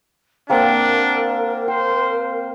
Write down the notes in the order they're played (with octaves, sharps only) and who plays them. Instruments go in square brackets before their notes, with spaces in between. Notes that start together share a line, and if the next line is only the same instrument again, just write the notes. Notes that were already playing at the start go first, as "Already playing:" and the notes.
[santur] A#3 C4 F#5 [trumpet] D4 [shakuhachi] A#4
[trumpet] C5 [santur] G5